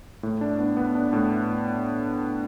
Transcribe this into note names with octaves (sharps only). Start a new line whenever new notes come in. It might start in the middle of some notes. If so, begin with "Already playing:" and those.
A2
D4
B3
B3
D4
A2